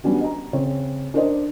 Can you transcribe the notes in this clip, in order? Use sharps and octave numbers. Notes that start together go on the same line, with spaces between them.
G3 B3 C#4 D4 F#4
D#5 A#5
C#3 C4 C#5
D4 A#4 C5 D5 D#5